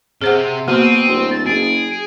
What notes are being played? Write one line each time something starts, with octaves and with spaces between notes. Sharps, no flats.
C3 G#4 C5 F#5
B2 A#3 C4 D#7
D1
A6
F#1 G#4 D7